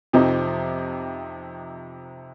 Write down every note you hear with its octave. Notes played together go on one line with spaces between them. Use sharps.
F2 C3 F3 C4 D#4